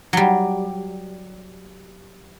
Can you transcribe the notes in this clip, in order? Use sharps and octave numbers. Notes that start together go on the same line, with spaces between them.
F#3 G3